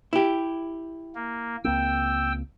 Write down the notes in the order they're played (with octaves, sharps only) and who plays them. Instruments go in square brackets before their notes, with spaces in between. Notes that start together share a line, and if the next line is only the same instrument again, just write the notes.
[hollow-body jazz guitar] E4 G4
[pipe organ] A#3
[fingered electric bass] C#2 A#3 C4 [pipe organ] G5 E6